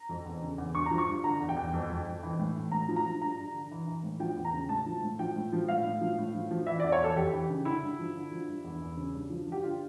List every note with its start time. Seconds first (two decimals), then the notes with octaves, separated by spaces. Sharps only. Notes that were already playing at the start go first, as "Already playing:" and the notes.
Already playing: A#5
0.09 F2
0.25 E2
0.42 C#3
0.58 E2
0.74 G2 C#6
0.86 F3 A#5
0.98 C#6
1.07 G2
1.24 D3 A#5
1.40 E2
1.49 G5
1.56 E2
1.73 F2
1.90 F2
2.06 F2
2.23 E3
2.39 A2
2.56 E3
2.72 A2 A#5
2.89 F3
2.96 A#5
3.05 F3
3.21 G2 A#5
3.38 G2
3.54 D3
3.71 E3
3.88 E3
4.04 A2
4.20 F3 G5
4.36 E2
4.45 A#5
4.53 C#3
4.69 A2 A5
4.86 F3
5.02 A2
5.19 F3 G5
5.36 A2
5.52 F3
5.68 A2 F5
5.85 A2
6.01 F3
6.18 A2
6.34 F3
6.51 F3
6.66 E3 E5
6.80 D5
6.84 E2
6.92 C#5
7.00 E3 A4
7.16 F2 G4
7.33 E3
7.50 C#3
7.65 D3 E4
7.82 G2
7.99 F3
8.16 D3
8.31 F3
8.48 G2
8.64 E2
8.81 E2
8.97 C#3
9.14 G2
9.30 F3
9.47 F3
9.52 G4
9.63 D3 F4